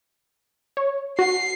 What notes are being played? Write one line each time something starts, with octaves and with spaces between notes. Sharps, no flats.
C#5
F#4 C7